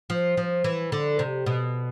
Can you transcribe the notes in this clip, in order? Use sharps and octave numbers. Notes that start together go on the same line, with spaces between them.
F3
F3
E3
D3
C3
B2